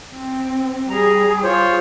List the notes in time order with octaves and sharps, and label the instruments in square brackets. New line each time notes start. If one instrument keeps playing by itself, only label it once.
[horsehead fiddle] C4
[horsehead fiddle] G3 G#4 [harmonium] A#5
[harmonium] F4 C5 C#5